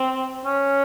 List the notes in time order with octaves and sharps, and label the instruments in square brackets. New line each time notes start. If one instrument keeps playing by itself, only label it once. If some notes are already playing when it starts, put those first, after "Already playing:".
Already playing: [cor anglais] C4
C#4